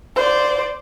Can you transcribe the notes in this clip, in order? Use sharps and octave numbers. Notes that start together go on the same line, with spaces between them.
C5 D5